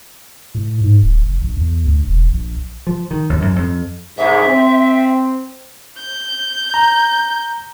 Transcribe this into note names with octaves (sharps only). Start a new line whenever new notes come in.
A2
G#2
D1
F#1
A#1
E2
D2
E1
A#1
F3
D#3
D#2
F#2
F2
C2 G#2 E5
C4
G6
A#5